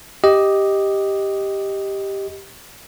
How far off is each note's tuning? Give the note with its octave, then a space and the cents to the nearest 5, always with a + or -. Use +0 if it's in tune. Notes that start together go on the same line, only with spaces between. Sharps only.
G4 +0 D#5 +5